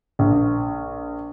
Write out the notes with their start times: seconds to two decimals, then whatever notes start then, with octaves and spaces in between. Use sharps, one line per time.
0.19 A#1